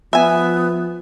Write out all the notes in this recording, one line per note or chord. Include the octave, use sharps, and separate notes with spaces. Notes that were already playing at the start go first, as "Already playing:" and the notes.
F3 B3 E5 G#5